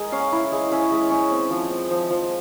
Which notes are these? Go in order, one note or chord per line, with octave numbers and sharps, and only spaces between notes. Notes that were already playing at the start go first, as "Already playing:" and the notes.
Already playing: G#3 A#4
C#4 F5
E4
G#3
C#4 E5
G#3
C#4
C4
F3
C4
F3
F3